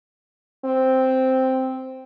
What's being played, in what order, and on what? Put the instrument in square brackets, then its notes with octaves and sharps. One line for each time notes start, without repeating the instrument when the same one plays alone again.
[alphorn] C4